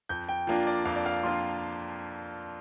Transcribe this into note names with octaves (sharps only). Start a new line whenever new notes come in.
F2 G6
G5
F3 A#3 D4 F4
D5
F2 F5
D5
F5
F3 A#3 D4 F4 C6